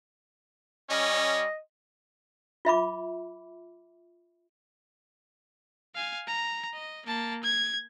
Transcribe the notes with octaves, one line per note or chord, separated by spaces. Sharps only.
G3 C#4 D#5
F4 E5 B5 D6
F5 G#5
A#5
D#5
A#3 A5
G#6